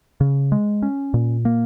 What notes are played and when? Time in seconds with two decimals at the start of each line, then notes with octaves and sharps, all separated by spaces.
0.21 C#3
0.52 G#3
0.82 C#4
1.14 A#2
1.45 A#3